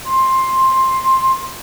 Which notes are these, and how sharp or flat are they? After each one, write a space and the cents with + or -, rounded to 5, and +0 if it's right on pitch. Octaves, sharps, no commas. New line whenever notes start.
C6 +10